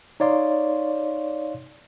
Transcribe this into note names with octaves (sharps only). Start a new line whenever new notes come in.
D#4 C#5 D5 F5 C6